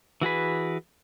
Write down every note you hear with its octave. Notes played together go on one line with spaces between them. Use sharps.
E3 F#4 G#4 B4